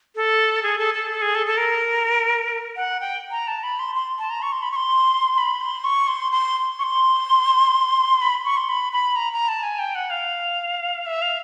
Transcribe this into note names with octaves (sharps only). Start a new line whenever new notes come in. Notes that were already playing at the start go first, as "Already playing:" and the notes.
A4
G#4
A4
A4
A4
G#4
A4
A4
A#4
F#5
G5
A#5
A5
B5
C6
C6
A5
A#5
C#6
C6
B5
C#6
C6
B5
C6
C#6
C6
C6
C#6
C6
B5
C#6
C6
B5
B5
A#5
A#5
A5
G#5
G5
F#5
F5
E5
F5